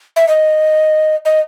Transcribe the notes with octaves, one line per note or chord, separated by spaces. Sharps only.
E5
D#5
D#5